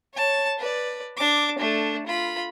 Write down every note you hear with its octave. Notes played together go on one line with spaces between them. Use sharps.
C#5 A5
B4 D5
D4 D6
A3 D4
F4 B5